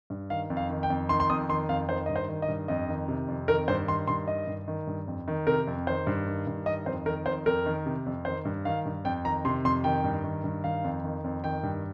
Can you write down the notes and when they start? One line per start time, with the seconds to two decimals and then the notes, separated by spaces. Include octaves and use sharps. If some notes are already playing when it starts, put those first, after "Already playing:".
0.10 G2
0.30 D#3 F5
0.50 F2
0.57 F5
0.70 D#3
0.83 G5
0.90 F2
1.09 D#3 C6
1.20 C6
1.30 F2 D#6
1.49 D#3 C6
1.69 F2 F5
1.89 D#3 C5
2.06 G2 D#5
2.16 C5
2.28 D#3
2.42 D#5
2.48 G2
2.68 F2 D#5
2.89 D#3
3.08 C3
3.28 F2
3.48 D#3 A#4
3.68 G2 C5
3.88 D#3 C6
4.07 G2 C6
4.28 D#3 D#5
4.47 G2
4.68 D#3
4.87 G2
5.07 F2
5.28 D#3
5.47 C3 A#4
5.67 F2
5.87 D#3 C5
6.07 G2
6.27 D#3
6.47 G2
6.66 D#3 D#5
6.86 F2 C5
7.06 D#3 A#4
7.26 F2 C5
7.46 F2 A#4
7.66 D#3
7.86 C3
8.06 F2
8.25 D#3 C5
8.45 G2
8.65 D#3 F5
8.85 G2
9.05 F2 G5
9.25 D#3 A#5
9.45 C3 C6
9.65 F2 C6
9.84 D#3 G5
10.04 G2
10.24 D#3
10.44 G2
10.64 D#3 F5
10.84 F2
11.04 D#3
11.24 F2
11.44 D#3 G5
11.63 G2